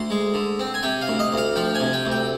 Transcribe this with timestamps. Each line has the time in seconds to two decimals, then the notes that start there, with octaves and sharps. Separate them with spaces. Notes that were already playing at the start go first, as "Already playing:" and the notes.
Already playing: D2 C6
0.10 G#3
0.34 D3
0.59 C4
0.74 G#5
0.83 C3 G5
1.01 F5
1.08 D2
1.19 D#5
1.33 D2 F5
1.56 F3 G5
1.75 G#5
1.80 C3
1.93 G5
2.05 D2
2.11 G5